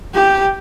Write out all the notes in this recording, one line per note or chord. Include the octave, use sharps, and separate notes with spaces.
G4